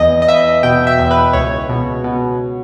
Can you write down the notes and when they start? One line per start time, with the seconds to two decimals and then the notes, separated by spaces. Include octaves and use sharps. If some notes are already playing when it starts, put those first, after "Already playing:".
Already playing: E2 D#5
0.22 D#5
0.28 E2 E5
0.63 B2 G5
0.87 E5
0.98 E2
1.11 B4
1.33 C#2 C#5
1.69 B2
2.04 B2